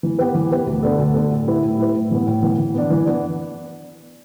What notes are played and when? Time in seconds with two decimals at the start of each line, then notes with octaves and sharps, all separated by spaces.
0.03 E3
0.19 B3 G4 B4
0.34 E3
0.51 B3 G4 B4
0.66 D2
0.83 D3 B3 D4 A4
0.99 D2
1.14 D3 B3 D4 A4
1.30 A2
1.47 G3 E4 B4
1.63 A2
1.78 G3 E4 B4
1.95 A2
2.11 E3 B3
2.27 A2
2.43 E3 B3
2.58 E3
2.74 B3 D4
2.90 E3
3.06 B3 D4